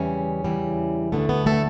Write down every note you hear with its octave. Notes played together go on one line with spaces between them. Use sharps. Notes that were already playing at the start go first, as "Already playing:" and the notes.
Already playing: E2 C#3 E3 G3 C#4
E2 C#3 E3 G3
D2 D3 A3 B3
B3
A3 A4